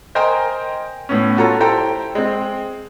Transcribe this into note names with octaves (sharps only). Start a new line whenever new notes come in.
A#4 C5 D#5 G5 G#5 A#5
A2 B3 C#4
F4 F#4 A4 C#5 A#5
E4 G4 A4 C5 G5 A#5
G#3 C4